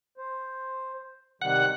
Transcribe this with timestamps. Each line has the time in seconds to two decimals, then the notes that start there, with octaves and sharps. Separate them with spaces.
0.17 C5
1.42 C3 D#3 G3 F#5